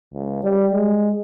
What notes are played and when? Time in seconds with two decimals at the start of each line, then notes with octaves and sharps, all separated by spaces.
0.14 C#2
0.44 G3
0.72 G#3